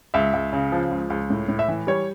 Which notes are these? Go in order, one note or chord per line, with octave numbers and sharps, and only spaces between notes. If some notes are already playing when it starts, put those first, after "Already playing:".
C#2 E5
C#2
C#3
F3
C#2
C#2
A2
A2
E5
E3
G3 C#5